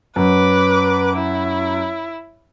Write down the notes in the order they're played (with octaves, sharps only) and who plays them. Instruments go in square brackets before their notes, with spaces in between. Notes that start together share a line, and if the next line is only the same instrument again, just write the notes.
[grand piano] F#2 [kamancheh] B4 D6
[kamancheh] E4